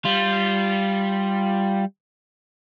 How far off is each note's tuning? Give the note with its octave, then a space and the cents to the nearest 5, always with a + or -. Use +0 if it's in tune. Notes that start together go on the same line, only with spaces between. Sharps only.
G3 +0 F4 -10